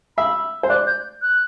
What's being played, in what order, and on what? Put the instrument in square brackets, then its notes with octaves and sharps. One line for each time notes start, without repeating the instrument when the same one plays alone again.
[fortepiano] E5 [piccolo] B5
[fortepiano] C5
[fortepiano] D5 [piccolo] F#6
[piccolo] G6
F#6